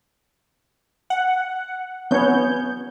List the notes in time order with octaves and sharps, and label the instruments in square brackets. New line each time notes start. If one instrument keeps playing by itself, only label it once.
[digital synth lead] F#5
[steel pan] B3 C#4 C#5 [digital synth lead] G6